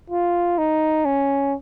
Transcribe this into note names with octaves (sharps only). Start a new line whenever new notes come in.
F4
D#4
C#4